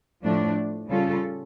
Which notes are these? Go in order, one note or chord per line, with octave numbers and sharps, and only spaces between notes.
A2 F3 A3 D4
C#3 G3 C#4 F4 A4